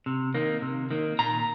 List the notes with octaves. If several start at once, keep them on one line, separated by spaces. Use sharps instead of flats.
C3
D#3 A#3
C3
D#3 A#3
A#2 A#5